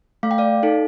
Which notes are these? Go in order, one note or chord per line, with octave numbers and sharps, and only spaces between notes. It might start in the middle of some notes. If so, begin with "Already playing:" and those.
A3 F5
G5
D5 F5
D#4 A4